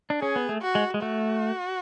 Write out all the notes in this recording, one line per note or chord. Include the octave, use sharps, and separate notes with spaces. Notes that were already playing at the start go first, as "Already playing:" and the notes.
D4
C#4 G#4
B3
A3
F#4
G#3
G#3
A3 F#4